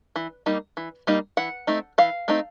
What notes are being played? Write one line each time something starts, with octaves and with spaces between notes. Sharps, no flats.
E3
G3 A#3 D#4
E3
G3 A#3 D#4
E3 F#5
A3 C4 D#4
E3 F5
A3 C4 D#4